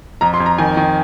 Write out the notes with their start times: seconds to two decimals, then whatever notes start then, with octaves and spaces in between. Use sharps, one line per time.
0.21 F2 A#5
0.34 C6
0.40 F2
0.46 A#5
0.58 D#3 G#5
0.77 D#3